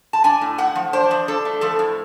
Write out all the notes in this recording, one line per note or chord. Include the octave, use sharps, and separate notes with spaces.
A5
D4 G#5
A2
A2 F#5
F3
D4 C5
F3
D4 A4
A3
F3 A4
A2